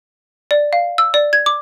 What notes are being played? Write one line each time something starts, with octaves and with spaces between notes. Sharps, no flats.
D5
F5
E6
D5
G#6
D6